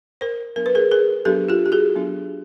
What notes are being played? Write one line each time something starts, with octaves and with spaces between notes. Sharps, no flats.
A#4 C5
F#3 B3 D4 A#4
B4
G#4 A#4
G#4 A#4
F#3 B3 D4 G4 A4
F4 G4
G4
F#4 G#4
F#3 B3 D4